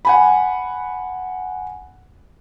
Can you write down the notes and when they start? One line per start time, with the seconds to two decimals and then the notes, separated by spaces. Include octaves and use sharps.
0.05 F#5 G#5 B5